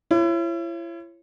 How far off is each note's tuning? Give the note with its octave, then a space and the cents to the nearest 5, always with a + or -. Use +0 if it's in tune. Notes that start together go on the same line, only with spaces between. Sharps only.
E4 +40 C#5 -20